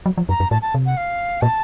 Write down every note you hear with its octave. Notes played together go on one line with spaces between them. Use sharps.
F#3
F3
F#2 A#5
F#2
A2 A5
A5
C3
F#5
F5
A#2 A5